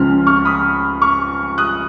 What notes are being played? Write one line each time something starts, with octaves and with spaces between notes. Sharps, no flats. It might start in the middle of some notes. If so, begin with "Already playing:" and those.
Already playing: C#2 C#3 F3 F6
C#6 F6
B5 D#6
C#6 F6
D#6 F#6